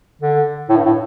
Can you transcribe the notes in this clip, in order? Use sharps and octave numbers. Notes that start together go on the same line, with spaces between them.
D3
A2
G2
A2